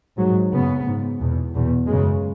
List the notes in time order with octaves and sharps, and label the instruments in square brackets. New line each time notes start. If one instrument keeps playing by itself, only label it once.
[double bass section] G#2 F#3
F#2 C#3 B3
G#2
E2 B2
E2 B2
F#2 C#3 G#3